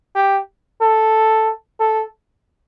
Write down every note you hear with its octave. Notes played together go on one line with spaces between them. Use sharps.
G4
A4
A4